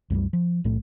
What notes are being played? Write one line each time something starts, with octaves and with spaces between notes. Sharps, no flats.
C2 F#2 F#3 G3
F3
B1 A2 A3